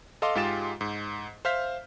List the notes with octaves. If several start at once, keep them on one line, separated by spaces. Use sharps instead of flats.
A4 D#5 F5 C6 D6
G#2 G#3 F4 G4 A6 E7
G#2
C5 E5 F5 F6 G6 B6